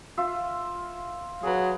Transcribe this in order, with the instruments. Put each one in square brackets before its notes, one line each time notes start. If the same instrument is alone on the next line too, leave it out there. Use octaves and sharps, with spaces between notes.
[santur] F4 E5 C6
[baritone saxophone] F#3 [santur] G#4 B4